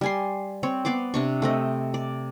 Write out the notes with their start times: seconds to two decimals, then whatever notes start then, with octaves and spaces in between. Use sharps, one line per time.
0.01 G3 G#5 C6
0.63 C4 C#5
0.85 B3 D5 C6 D6
1.14 C3 D4 C#6
1.42 A3 C4 D#5
1.94 D5